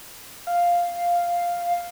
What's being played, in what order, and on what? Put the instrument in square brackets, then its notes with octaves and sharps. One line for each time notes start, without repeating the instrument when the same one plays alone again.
[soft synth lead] F5